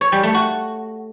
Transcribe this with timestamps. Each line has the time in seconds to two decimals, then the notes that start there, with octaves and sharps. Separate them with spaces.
0.01 C#5
0.12 G3
0.23 A3
0.34 F#4